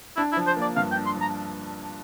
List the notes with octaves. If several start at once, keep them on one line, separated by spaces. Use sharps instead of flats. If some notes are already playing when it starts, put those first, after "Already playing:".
D4 E4
E4
F3
C5
A#3
D5
G2 F5
G5
D4
C6
F3
A#5